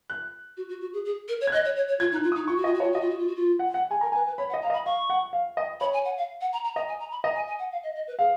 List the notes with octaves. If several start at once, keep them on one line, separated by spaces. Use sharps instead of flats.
F#6
F#4
F#4
F#4
G#4
G#4
A#4
C#5
G#6
D#5 F#6
C#5
C#5
C#5
F4 G#6
D#4
F#6
F4
D#6
D#4
F4 C#6
F#4
F4 D#5
F#4
C#5
F4
F#4 D#5
F4
F#4
F4
F#4
F4
F#5
F#5
G#4 G#5
A#4 A#5
B4 G#5
B4
C#5 B5
F#5
D#5
A#5
F5
D#5
B5
F5 C#6
F#5
F5
D#5
C#5 B5
G#5
F#5
F5
F#5
A#5
A#5
D#5 A#5
G#5
A#5
B5
D#5 A#5
G#5
G#5
F#5
F5
D#5
D#5
B4
G#4 F5